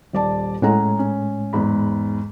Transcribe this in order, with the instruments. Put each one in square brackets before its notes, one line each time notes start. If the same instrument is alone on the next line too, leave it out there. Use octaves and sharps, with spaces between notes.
[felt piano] D#1 D5 A5
[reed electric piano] A2 G#3 [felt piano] C#4 F#5 A#5
[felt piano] C#4
E2 G#2 B5